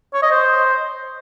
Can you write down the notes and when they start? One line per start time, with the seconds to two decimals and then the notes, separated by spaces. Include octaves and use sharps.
0.14 C#5
0.23 D#5
0.31 C5